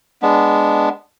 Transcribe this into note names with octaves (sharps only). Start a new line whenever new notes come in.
G#3 B3 D4